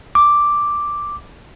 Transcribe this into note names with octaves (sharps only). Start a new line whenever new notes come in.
D6